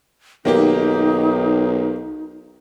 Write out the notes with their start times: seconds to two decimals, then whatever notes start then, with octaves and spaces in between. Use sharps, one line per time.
0.45 B1 D#3 A#3 D#4 G4